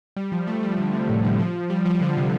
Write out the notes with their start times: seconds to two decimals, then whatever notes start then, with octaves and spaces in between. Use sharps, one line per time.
0.16 G3
0.32 F3
0.47 A3
0.63 G3
0.78 D3
0.93 C3
1.09 A2
1.24 D3
1.40 F3
1.70 G3
1.86 F3
2.01 D3
2.17 C3